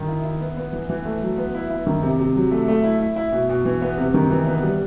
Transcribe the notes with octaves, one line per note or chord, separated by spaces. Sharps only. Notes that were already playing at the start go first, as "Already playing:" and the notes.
Already playing: D#3
E4
E4
B3
B3
E3
E3
A3
F#3
B3
E4
E4
D#3
C3
C3
F#3
A3
A3
E4
E4
E4
B2
B2
E3
B3
C3
D#3
E3
B3
G3